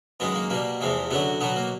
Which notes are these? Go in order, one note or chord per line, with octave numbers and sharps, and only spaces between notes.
F#2 D#3 G#3 B3
A#3
B2 G3 A#3
E2 C3 F3 G#3
F#2 D3 F#3 B3
B2 F#3 B3
A#3